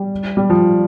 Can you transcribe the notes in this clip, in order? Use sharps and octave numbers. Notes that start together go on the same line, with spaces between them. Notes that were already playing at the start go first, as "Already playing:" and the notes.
Already playing: G3
G3
F3